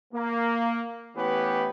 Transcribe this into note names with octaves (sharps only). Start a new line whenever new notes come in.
A#3
E3 A3 B3 C#4 G4 B4